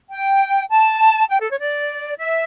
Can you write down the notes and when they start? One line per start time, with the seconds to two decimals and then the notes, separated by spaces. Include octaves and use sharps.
0.09 G5
0.70 A5
1.29 G5
1.40 A4
1.50 C#5
1.60 D5
2.18 E5